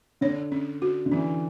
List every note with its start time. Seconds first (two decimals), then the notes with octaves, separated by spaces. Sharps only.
0.21 D3 C#5
0.52 C#4
0.82 F#4
1.06 D3
1.11 E3 C#4